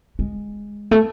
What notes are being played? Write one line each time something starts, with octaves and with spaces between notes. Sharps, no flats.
G#3
A3